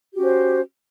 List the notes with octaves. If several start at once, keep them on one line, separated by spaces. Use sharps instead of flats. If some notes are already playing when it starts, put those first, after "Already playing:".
C#4 F#4 G4 C5